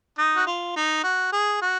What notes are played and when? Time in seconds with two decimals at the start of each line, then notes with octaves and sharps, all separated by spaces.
0.18 D#4
0.36 F#4
0.47 F4
0.76 D#4
1.03 F#4
1.32 G#4
1.62 F#4